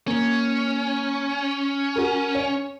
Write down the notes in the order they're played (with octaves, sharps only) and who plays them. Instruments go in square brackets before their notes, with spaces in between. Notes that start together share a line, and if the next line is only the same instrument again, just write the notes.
[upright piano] A#3 [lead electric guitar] C#4
[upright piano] F#4 A#4
C#5